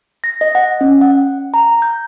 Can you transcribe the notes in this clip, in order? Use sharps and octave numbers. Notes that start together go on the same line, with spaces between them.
A#6
D#5
F#5
C#4
F#5
G5
A#5
G6